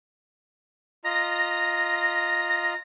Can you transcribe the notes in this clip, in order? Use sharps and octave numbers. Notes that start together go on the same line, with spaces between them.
F4 D#5 A#5 A#6